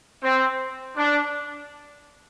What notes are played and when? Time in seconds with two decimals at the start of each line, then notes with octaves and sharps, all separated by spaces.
0.22 C4
0.96 D4